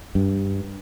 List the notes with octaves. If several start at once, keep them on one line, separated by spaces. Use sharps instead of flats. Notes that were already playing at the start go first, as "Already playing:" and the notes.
G2